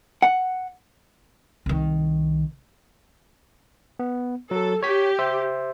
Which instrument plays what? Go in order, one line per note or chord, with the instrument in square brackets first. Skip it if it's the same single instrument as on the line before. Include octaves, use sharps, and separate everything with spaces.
[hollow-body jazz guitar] F#5
[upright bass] C2 D#3
[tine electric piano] B3
[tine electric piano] F#3 [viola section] A4
[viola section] G4 [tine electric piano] C#5 B6
[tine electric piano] C5 E5